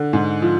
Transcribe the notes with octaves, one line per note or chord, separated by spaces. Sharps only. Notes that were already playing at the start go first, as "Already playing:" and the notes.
Already playing: D3
G#2
F3